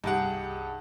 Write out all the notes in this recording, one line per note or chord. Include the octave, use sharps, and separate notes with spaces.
C2 G2 D#4 G4 G#4 F#5